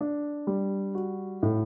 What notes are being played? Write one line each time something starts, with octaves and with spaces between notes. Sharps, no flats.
D4
G3
F#4
A2